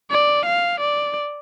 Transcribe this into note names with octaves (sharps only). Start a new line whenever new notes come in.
D5
F5
D5